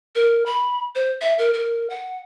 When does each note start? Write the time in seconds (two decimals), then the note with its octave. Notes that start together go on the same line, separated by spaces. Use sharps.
0.15 A#4
0.46 B5
0.95 C5
1.21 E5
1.38 A#4
1.53 A#4
1.90 F#5